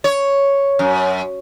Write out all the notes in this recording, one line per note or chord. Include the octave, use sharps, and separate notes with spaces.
C#5
F#2